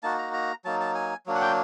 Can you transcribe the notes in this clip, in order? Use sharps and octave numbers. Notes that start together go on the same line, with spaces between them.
A#3 D#4 F#4 A5
A#5
A#5
F#3 A#3 D#4 A5
A5
G#5
F#3 A#3 D4
F#5
G5